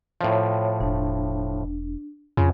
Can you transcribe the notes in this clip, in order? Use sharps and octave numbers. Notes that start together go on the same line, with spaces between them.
A2 F3 C#5 E5
E1 D4
F2 C#3 F4